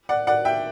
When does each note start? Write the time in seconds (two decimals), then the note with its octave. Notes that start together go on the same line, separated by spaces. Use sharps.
0.09 D5 F#5
0.27 D5 F#5
0.45 E5 G5